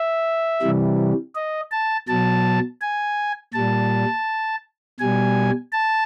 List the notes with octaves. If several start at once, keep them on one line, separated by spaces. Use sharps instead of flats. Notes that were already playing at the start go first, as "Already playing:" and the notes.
Already playing: E5
C3 E3 G3
D#5
A5
B2 F#3 A5
G#5
A#2 G3 A5
B2 G3 G#5
A5